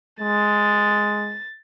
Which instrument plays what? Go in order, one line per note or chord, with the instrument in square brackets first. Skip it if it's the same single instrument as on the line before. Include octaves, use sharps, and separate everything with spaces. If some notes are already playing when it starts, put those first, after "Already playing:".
[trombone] G#3 [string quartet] A6